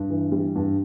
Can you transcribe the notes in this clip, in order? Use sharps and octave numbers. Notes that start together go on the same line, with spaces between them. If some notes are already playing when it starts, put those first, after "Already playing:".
Already playing: G2
E3
G3
G2